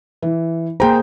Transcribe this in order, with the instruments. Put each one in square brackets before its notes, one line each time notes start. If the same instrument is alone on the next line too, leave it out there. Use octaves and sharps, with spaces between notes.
[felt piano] E3
[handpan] A#3 G#4 C5 [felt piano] G5 A#5